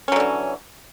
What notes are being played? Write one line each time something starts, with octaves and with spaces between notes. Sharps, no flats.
D3 E3 F#3 C#4